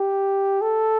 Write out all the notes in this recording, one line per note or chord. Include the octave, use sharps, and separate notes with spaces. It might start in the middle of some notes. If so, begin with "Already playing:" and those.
Already playing: G4
A4